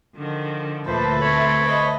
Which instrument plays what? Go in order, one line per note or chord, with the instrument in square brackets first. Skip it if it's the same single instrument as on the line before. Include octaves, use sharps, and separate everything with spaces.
[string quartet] D3 D#3 F3
[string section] D2 A4 E5 [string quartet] A#2 F3 [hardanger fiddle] B4 [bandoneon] C5
[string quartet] C4 C6 [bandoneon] C#5 B5
[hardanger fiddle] B4 D#5 [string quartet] C5